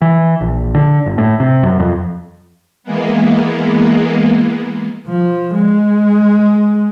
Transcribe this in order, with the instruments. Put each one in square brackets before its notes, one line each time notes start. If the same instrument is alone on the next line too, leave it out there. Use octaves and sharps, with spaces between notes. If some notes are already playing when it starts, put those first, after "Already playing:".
[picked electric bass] E3
A#1
D3
G1
A2
C3
F#2
F2
[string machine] E3 G#3 A#3 B3
[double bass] F3
G#3